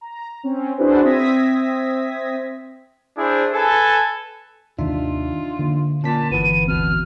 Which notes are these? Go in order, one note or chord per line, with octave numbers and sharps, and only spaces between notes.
A#5
C4 C#4
D4 E4 F#4 G#4 B4 C5
C4 E5 D#6 G#6 A#6 B6
D4 E4 G#4 C5
A4 B4 G#5 A5
D#2 C3 D#3 D4 D#4 F4 E5
D3 A#3
A#2 C#4 F4 A5 B6
G1 E3 B3 D#7
D1 B2 C4 F6